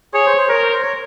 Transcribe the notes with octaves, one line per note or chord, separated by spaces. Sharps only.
G#4 C#5
C5
C5
A#4 C#5
C5
C5
C#5